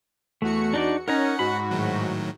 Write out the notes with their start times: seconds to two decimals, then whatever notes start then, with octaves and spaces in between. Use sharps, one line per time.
0.42 E2 A3 F#4 C#7
0.74 D4 D#4 D5
1.08 C#4 D#4 A#4 C#5 F#5 A#5
1.39 G#2 F#4 B5
1.71 A2 D#3 F#3